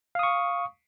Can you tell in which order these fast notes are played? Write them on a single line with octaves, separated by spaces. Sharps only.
F5 D#6 C#6